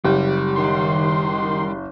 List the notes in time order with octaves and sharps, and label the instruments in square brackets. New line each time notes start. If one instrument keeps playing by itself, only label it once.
[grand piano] F#1 [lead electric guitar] G3 [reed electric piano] G4
[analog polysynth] D#3 C6